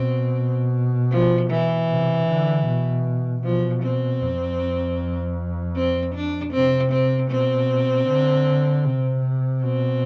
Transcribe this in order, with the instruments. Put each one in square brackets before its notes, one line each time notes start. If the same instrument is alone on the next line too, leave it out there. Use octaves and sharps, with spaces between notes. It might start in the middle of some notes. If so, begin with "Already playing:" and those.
Already playing: [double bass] B2 [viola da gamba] C4
[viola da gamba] F3
E3
[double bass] C3
D3
B2
[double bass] B2 [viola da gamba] F3
[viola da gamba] C4
[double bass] F2
[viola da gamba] C4
D4
[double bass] C3 [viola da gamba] C4
[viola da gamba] C4
[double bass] B2 [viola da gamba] C4
[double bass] D3
C3
[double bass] B2 [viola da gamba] C4